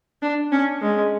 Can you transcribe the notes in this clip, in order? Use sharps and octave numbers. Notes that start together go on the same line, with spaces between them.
D4
C#4
G#3